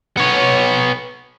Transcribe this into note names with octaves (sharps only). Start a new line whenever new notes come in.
B3 C#5